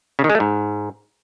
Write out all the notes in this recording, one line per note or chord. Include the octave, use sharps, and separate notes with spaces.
C#3
D#3
G#3
A3
G#2